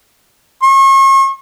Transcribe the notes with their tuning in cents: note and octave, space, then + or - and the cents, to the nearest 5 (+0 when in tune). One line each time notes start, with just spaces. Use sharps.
C#6 -40